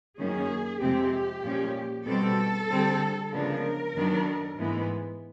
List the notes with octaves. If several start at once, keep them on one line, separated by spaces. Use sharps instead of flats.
F#2 D#3 F#3 A#3 C#4 G#4
F2 C3 F3 G#3 C4 G4
A#2 F3 G#3 C#4
B2 G3 C4 A4
D3 G3 C4
C#3 F3 G#3 B3 D4 A#4
F#2 D#3 F#3 B3 D4
G#2 E3 G#3 B3